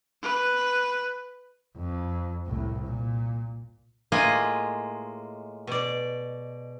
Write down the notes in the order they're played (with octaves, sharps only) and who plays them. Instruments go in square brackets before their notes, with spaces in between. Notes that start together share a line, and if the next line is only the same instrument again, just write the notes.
[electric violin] B4
[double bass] F2
C2 A2
A#2
[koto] A2 G#3 A#3 F4 D#5 G#5
B2 D5